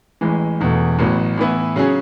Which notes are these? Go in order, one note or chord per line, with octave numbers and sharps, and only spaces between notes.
A1 A2 E3 G#3
E1 E2 B2 A3
A1 A2 F#3 B3
A2 E3 B3 E4
C#3 F#3 C#4 G#4